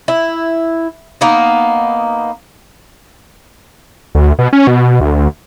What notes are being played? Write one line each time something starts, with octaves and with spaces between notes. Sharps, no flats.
E4
A#3 B3 D#4
D2
B2
C#4
B2
D2